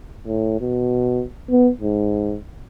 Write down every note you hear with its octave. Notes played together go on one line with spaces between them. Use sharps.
A2
B2
B3
G#2